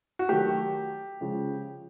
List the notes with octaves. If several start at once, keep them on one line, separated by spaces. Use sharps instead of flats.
F#4
D#3 F#3 A3 G4
C#3 F3 G#3